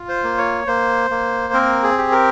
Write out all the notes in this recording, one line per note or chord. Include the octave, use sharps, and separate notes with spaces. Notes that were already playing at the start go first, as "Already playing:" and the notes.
Already playing: F4
C5
A#3
C#5
A#3 C5
A#3
C4 A#4
G#4
G4
A#4